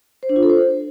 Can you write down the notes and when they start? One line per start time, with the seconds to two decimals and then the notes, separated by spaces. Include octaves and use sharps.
0.23 C5
0.29 D4
0.36 F4
0.43 A4
0.49 C5